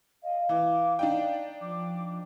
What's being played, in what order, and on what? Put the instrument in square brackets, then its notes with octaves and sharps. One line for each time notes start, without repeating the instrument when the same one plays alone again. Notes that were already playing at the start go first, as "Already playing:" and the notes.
[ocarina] D#5 [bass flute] F5
[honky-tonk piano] E3 [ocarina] D6
[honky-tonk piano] D4 D#4 G5 [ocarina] D5
[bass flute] F3 [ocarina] D6